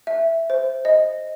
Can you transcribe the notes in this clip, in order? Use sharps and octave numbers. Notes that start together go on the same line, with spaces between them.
E5
C5
D#5